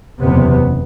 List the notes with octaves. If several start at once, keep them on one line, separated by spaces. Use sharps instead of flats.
F#1 E2 C3 B3